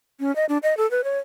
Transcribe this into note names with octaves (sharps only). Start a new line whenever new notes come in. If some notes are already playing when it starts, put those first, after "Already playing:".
C#4
D#5
D4
D#5
A4
B4
C#5